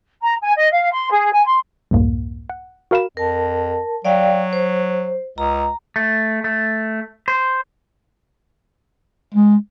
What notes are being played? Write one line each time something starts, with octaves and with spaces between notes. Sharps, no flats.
A#5
G#5
D#5
F5
C6
G#4
G#5
C6
C2 F2 G#2 A#3
F#5
F#4 A#4 F5 B5 E7
F2 A#4 A5
F#3 D5 F5 G5
C5
C#2 A#5
A3
A3
C5
G#3